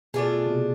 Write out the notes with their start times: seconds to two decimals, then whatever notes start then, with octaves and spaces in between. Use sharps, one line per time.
0.14 B2 A3 D4 F4 G#4
0.46 C3
0.50 B2